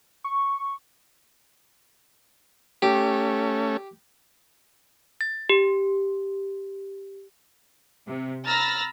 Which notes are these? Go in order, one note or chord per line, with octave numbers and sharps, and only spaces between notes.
C#6
A3 C#4 G4
A6
G4
C3
A#5 B5 E6 F6 A6 A#6